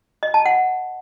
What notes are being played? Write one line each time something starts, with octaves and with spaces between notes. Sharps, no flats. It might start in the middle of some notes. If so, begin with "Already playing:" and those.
D#5
A5
F#5